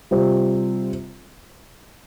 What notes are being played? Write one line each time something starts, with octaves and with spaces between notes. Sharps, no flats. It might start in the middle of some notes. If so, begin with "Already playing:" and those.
C3 G3 C4 F4